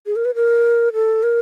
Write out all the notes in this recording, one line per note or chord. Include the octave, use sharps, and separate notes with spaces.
G#4
A#4
B4
A#4
A4
A#4